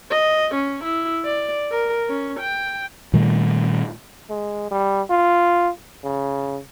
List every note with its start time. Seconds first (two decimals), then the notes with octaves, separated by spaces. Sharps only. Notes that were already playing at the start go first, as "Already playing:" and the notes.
0.11 D#5
0.55 C#4
0.84 E4
1.25 D5
1.72 A#4
2.09 C#4
2.40 G5
3.13 A#2 D#3 G3 A3
4.30 G#3
4.71 G3
5.10 F4
6.04 C#3